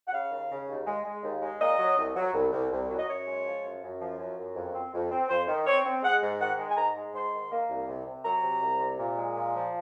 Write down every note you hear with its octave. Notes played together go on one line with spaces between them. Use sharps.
F#5
C#3 F5
D#2
C#3
D#2
G#3
G#3
D#2
G#3
A#2 D#5
F#3
C2
F#3
C2
C2
C2
F#3
D#5
F#2 C#5
G#3
F3
F#2
F#2
F3
F#2
F#2
F2
C4
F2
C4
F2 C5
D#3
C4 C#5
C4
G#3 F#5
G#2
D#3 F#5
G#3
G#5
G#2 A#5
G#3
G#2 C6
D#3
A#3
C2
C3
C3
F#3 A#5
C3
C2
C3
A#2
G#3
A#2
F3